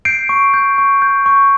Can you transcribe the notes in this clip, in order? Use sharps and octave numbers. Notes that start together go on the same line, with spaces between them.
G6 C7 D7
C#6
G6
C#6
G6
C#6